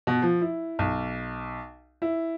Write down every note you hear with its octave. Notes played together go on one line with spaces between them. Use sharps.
B2
F3
E4
B1
E4